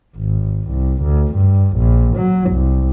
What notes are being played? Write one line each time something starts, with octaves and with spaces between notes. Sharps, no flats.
G#1
C2
D2
G2
A#1
F#3
C2